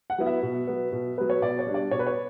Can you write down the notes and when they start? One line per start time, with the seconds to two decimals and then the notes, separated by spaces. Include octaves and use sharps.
0.10 F#5
0.18 F#3 B3 E4
0.26 E5
0.43 B2
0.67 F#3 B3
0.92 B2
1.18 F#3 B3 B4
1.30 C#5
1.42 B2 D5
1.59 C#5
1.67 G3 D4
1.74 D5
1.91 B2 C#5
1.99 B4
2.07 C#5